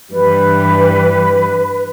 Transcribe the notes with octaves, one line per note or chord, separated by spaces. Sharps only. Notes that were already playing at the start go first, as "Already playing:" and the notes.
G2 E3 G3 B4